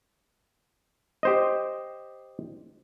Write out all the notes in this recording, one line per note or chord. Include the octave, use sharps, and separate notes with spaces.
G4 C5 D#5